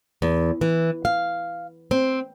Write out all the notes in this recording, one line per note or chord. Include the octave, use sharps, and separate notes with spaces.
E2
E3
F5
C4